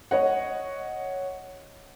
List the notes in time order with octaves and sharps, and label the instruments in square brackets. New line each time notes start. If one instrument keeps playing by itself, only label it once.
[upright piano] C#5 D#5 F#5